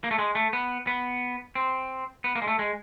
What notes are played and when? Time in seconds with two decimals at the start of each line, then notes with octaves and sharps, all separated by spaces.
0.04 A#3
0.11 A3
0.19 G#3
0.35 A3
0.53 B3
0.87 B3
1.55 C4
2.24 B3
2.36 A#3
2.42 G#3
2.48 A3
2.59 G#3